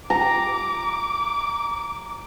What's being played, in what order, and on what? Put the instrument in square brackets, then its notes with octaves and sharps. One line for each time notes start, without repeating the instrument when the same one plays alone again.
[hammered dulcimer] A#5 [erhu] D6